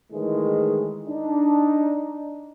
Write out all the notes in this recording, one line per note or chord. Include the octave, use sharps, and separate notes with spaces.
A2 D#3 E3 G#3
D4 D#4